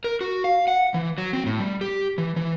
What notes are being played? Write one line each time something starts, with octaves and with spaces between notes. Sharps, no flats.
A#4
F#4
F5
F#5
E3
F#3
C4
A2
G3
G4
E3
E3